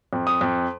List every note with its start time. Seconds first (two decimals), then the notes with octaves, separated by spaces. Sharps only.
0.13 F2
0.27 D#6
0.41 F2